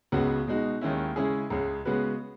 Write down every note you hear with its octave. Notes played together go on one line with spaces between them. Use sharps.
C#2 C#3 G#3 B3 F#4
B2 G#3 D#4 F#4
D#2 D#3 G#3 C#4 E4
C#3 G#3 C#4 E4 G#4
C#2 C#3 G#3
C#3 G#3 B3 F#4 B4